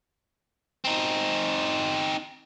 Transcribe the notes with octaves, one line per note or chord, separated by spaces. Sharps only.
C4 D#4